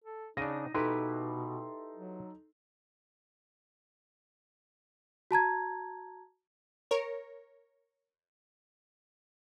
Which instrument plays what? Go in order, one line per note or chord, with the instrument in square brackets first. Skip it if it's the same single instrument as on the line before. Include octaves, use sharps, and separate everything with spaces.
[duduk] A4
[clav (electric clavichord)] C#3 D4 [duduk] D#4 [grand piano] A#6 D#7
[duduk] B2 [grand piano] D#4 A4 C6 [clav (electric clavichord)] E4 G4 B4
[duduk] F#3
[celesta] F#4 A5 A#5 G#6
[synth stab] A#4 C#5